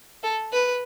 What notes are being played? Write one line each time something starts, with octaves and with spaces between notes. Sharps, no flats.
A4
B4